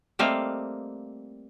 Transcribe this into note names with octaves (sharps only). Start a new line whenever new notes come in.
G3 A3 A#3 C4 D#5 F5